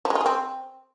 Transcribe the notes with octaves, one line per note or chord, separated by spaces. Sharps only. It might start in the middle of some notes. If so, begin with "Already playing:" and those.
F3
G#3
F4
G#4
C4